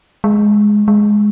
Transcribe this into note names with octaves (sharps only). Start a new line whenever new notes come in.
G#3
G#3